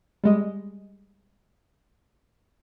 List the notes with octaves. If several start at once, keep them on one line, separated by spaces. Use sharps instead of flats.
G3 G#3 D#5